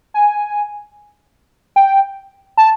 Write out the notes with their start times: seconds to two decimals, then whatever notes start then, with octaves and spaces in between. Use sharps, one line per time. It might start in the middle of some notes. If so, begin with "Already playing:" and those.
0.14 G#5
1.76 G5
2.57 A5